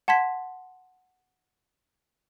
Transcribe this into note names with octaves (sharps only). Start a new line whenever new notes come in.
F#5 A5 C6 G#6 B6